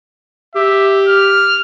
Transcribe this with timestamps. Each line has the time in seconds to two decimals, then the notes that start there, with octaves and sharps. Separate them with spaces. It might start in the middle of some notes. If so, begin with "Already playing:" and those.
0.56 G4 E5
1.08 F6